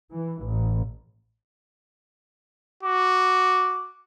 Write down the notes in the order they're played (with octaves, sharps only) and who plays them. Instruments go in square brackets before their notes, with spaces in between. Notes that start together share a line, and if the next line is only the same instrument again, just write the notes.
[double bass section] E3
A1
[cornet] F#4 [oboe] D6